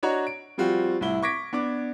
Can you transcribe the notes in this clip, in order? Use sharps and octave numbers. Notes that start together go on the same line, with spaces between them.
D4 F#4 C#5 D#5 A#5
D7
F3 G3 C4 F4 F#4
C2 A2 E4 G7
C#6 D6 G#6 A#6 B6 D7
B3 D4 D6